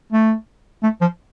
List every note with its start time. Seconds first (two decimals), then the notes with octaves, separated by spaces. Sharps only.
0.12 A3
0.83 A3
1.01 F3